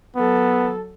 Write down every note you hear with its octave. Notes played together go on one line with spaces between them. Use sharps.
F#3 B3 A4